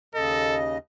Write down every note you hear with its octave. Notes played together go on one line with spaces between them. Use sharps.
D#2 C#3 A4 D#5